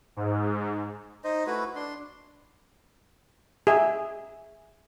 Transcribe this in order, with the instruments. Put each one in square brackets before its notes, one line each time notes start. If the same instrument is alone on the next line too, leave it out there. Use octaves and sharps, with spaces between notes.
[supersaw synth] G#2
[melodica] D#4 C5 D#5
A3 E4 F#4 B4
D4 C6
[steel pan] G#4 E5